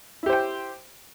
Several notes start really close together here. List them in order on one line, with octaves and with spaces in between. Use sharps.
E4 G4 C5 G5